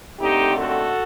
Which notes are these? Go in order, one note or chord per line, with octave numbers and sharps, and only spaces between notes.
D#2 D3 A3 C4 D#4 G4
F#4 A4